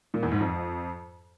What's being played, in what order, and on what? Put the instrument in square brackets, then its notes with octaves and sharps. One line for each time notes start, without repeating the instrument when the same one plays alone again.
[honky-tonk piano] A#2
E2
G#2
F2